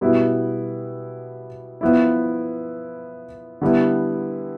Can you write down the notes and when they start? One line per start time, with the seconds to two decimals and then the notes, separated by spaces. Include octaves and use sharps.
0.01 B2 G3 B3 E4
1.81 F3 B3 E4
3.61 D3 G3 B3 E4